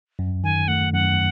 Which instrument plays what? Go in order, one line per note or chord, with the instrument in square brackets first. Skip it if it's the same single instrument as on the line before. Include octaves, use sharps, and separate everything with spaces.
[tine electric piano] F#2
[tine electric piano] D#3 [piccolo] G#5
[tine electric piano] A3 [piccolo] F#5
[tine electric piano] F#2 [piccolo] F#5